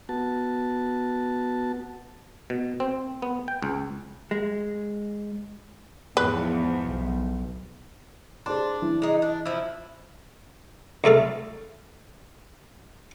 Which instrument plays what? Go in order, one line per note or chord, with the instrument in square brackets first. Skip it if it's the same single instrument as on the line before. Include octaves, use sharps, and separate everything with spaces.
[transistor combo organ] B3 F#4 A5
[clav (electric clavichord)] B2
C4
B3
G5
C#2
[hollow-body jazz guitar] G#3
[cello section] E2 F3 [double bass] G#2 [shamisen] B4
[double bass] B1
[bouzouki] D4 [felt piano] G#4 C5 C6
[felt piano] E3
[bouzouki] G#3 D#4
D4
F3 E4
[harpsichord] C#2 A3 A4 F5